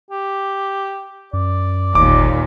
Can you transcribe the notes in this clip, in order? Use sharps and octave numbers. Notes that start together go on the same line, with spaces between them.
G4
F#2 D5
G1 D#2 A#2 D6